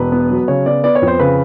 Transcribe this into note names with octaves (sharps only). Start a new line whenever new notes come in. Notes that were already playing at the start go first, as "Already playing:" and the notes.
Already playing: E1 B4
B3
F#3
C#3 C#5
B3 D5
B3 D5
C#5
F2
C5
C#3 B4